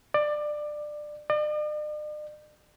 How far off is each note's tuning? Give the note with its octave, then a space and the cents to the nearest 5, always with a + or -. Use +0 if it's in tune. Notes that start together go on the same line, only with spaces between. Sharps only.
D5 +20
D5 +45